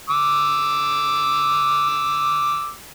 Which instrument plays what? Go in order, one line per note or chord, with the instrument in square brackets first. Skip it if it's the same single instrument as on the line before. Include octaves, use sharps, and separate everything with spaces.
[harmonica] D6 E6